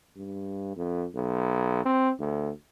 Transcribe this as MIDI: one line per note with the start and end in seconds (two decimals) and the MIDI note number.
0.17 0.74 43
0.77 1.06 41
1.15 1.84 35
1.85 2.11 60
2.20 2.50 38